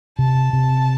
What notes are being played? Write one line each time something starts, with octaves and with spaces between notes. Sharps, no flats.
C3 A5
C3